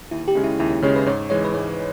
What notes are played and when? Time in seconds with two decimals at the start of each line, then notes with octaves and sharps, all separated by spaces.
0.11 D#2 E4
0.28 G4
0.35 C#3 G#3 C#4
0.44 E4
0.60 D#2 E4
0.71 E4
0.82 C#3 G#3 C#4 C#5
0.95 B4
1.06 G#2 C#5
1.30 E3 G#3 C#5
1.44 B4
1.54 G#2 C#5